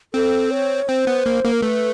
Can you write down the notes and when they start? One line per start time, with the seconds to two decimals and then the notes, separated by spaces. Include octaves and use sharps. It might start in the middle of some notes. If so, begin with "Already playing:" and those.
0.14 C4 A4
0.51 C#5
0.88 C4 C5
1.07 B3
1.26 A#3
1.44 A#3
1.52 A#4
1.62 A3 B4